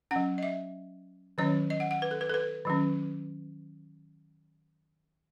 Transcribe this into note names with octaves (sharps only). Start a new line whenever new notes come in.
F#3 C#4 F#5
D#5
E5
D#3 F#3 C#4 C#5
D#5
F#5
F#5
B4
A4
B4
A4
B4
D#3 F#3 C#4